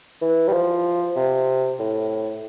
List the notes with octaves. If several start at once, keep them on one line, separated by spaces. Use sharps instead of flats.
E3
G3
F3
C3
A2